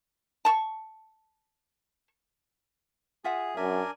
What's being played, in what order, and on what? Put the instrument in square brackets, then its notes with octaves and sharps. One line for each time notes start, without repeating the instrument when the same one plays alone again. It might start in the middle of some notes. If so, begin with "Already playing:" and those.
[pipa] A5 C#6
[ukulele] F4 E5 F#5 [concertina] G#4
[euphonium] F#2 [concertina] D4 A#4 G#5 [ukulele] E5